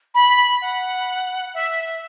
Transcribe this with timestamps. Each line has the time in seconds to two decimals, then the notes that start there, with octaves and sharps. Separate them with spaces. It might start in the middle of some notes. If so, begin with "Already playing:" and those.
0.14 B5
0.61 F#5
1.54 E5